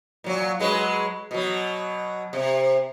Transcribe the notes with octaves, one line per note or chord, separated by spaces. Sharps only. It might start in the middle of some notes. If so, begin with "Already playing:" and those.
A#2 F#3
F#3 G#3 B4
B2 F#3
C3